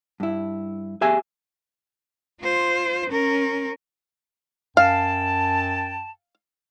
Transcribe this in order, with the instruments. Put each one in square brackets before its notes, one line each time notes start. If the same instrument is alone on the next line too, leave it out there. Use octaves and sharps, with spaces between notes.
[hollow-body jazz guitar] G2 E4
G4 G#4 E5 G#5
[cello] F4 C5
C#4 A#4
[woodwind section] F#2 G5 A5 [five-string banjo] F5